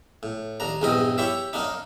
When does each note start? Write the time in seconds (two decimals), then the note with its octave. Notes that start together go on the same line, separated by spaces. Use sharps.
0.23 A2
0.60 D#2 D4 A#5
0.82 A#1 E2 G2 E3 C4 D#5
1.18 E4 G4 C#5 E5
1.53 F#2 A#3 D4 D#4